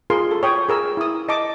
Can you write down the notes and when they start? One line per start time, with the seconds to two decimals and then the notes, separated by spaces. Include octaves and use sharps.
0.10 F4 G#4 A#4 C6
0.31 A4
0.43 C#5 G5 D#6
0.69 G#4 A#4 E6
0.97 E4 D#6
1.29 D#5 A5 D6